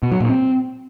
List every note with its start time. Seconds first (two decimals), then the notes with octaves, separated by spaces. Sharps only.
0.03 B2
0.12 F#3
0.20 A#2
0.29 C4